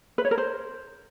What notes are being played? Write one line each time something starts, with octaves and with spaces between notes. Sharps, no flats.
B4
C#5
A#4
C5